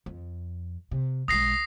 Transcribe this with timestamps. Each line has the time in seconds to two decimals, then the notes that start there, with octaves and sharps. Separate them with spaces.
0.06 F2
0.91 C3
1.28 B1 G#3 D#6 A#6 C7